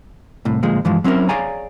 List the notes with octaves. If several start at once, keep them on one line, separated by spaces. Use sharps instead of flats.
C2 A2
D2 A#2 F3 G#3
G2 E3 F3 G#3
F#3 C4 C#4 E4 A#4
G#4 C#5 D5 F5 G#5 A#5